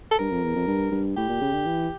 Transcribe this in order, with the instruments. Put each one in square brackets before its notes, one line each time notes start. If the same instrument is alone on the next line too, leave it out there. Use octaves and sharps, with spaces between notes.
[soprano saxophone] A4
[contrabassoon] G2 [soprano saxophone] A#4
[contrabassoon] F2
E2
F2
G2
G2
[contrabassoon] A2 [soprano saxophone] G4
[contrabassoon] A#2
C#3
D3
E3